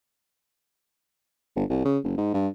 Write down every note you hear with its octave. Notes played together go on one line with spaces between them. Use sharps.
G1
C2
C#3
F#1
G#2
G2